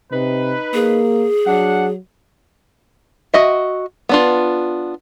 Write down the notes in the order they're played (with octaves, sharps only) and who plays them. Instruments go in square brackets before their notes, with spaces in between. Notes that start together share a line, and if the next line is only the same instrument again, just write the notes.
[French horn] C3 [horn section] D#4 B4
[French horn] A#3 [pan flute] G#4
[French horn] F#3 [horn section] D4 F#5
[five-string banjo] F#4 D#5 E5
B3 D4 F4